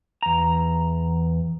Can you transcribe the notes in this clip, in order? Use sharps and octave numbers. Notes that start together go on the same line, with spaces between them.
E2 A#5